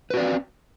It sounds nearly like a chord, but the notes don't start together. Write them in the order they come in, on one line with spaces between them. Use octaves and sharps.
B4 F#4 D5 C4